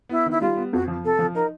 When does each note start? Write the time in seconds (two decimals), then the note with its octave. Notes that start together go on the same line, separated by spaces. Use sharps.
0.09 B3 E4
0.26 D#3 E4
0.41 G3 F4
0.57 B3
0.72 F2 F#4
0.88 F3
1.04 C3 A4
1.19 F3
1.34 D#4 A#4